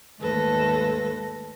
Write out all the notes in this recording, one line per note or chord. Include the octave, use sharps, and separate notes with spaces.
D#2 G#2 A3 A4 B4 A#6